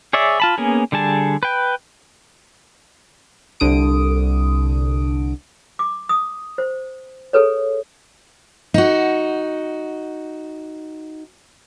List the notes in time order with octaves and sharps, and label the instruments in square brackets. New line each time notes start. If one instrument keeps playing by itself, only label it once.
[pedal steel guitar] G#4 C#5 D5 E5
F4 A5 B5
A#3 B3 C#4 G#4
D3 G3 G#4 A5
B4 G5
[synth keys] C2 D3 D#6 D7
[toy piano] D6
D#6
C5
G#4 A4 B4 C#5
[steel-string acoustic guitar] D#4 F#4